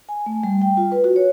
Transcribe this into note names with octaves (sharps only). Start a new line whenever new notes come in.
G#5
A3
G3
G5
F4
B4
F#4
C#5